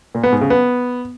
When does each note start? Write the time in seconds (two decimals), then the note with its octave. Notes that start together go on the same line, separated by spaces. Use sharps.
0.15 A#2
0.23 B3
0.32 G#2
0.41 C#3
0.50 B3